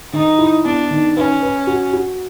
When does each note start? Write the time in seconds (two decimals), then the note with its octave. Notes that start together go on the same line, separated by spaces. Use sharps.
0.13 D#3 D#4
0.38 E4
0.65 B3 D4
0.91 D#3
1.16 C#4 B4
1.42 B4
1.67 F#4
1.93 F#4